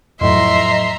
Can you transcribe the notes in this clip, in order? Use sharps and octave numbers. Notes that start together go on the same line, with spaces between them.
F2 A2 F#3 D#5 E5 A#5 C6